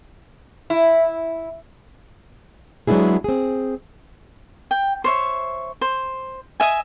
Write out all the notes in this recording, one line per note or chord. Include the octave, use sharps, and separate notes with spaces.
E4
F#3 G#3 B3 D4 E4 G#4
C4 G#4
G5
C5 C#5 E5
C5
D#5 E5 G#5